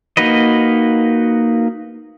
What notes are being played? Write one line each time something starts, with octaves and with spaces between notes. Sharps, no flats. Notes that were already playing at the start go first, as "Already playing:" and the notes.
A#3 D#4 F#4 B4 D#5